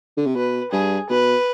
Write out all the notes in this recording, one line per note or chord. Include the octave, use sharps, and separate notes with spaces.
D3
C3
B2 B4
G2 G#4
B2 B4